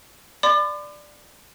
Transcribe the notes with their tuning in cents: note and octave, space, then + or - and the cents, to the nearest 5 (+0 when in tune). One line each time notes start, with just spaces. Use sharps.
D5 +5 B5 +45 D6 +35